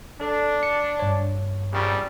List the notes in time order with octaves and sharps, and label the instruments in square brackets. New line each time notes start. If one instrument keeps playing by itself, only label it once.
[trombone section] D4 [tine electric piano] A4
[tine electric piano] C#7
G2 C#5
[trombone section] A#1 C#3 G3